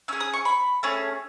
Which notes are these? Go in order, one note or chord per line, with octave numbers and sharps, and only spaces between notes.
C#4 G#4 E6
D#6
C#6
B5
A3 C#4 G#4